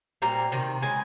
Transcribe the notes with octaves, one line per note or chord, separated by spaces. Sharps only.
A#2 G3 C4 A#5
C3 D#3
C#3 G#3 G#5